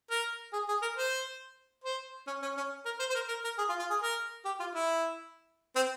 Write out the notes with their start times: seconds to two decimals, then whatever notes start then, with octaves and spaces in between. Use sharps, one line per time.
0.10 A#4
0.53 G#4
0.68 G#4
0.82 A#4
0.97 C5
1.84 C5
2.27 C#4
2.42 C#4
2.57 C#4
2.85 A#4
2.99 C5
3.10 C5
3.15 A#4
3.28 A#4
3.44 A#4
3.58 G#4
3.69 F4
3.79 F4
3.90 G#4
4.02 A#4
4.45 G4
4.60 F4
4.74 E4
5.76 C4